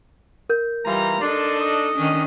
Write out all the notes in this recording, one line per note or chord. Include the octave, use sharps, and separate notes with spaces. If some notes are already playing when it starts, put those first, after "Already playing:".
A#4 G6
E3 G3 F4 A#5
D4 D#4 A4 D5 C6
D#5
D#3 C#4 D4